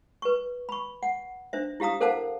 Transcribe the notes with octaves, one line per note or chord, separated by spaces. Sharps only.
B4 C#6
B5 C#6
F#5
D4 C5 E5
E4 G4 F5 A#5 D#6
A4 A#4 C5 F5 F#5 A5